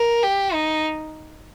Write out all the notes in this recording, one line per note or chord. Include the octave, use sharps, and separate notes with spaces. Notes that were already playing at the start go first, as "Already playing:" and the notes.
Already playing: A#4
G4
D#4